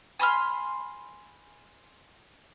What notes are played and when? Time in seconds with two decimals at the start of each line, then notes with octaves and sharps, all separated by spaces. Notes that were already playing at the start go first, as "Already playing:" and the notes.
0.19 G#5 B5 C6 F6